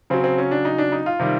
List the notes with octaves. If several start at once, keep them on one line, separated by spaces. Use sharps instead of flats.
C#3 F#3 C4
C4
C#4
D4
D#4
D4
D#4
F4
C3 D#3 G3